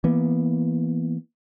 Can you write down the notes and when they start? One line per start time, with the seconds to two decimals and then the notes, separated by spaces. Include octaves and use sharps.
0.04 E3 A#3 B3